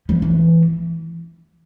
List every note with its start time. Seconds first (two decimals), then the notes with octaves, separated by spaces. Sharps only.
0.09 F3
0.22 E3